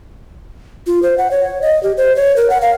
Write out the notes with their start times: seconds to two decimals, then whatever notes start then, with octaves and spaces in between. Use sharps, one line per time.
0.87 F4
1.03 C5
1.18 F#5
1.31 C#5
1.62 D#5
1.83 G4
1.97 C5
2.16 C#5
2.36 A#4
2.50 F#5
2.62 F5